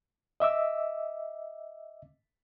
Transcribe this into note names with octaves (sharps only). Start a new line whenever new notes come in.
D#5 E5 D6 E6